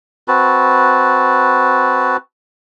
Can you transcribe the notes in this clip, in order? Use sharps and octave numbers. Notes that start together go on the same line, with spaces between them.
C4 F#4 B4 A5